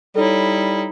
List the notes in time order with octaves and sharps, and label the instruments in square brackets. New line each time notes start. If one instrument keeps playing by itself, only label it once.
[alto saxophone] G3 [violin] D#4 E4 [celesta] A4 C#5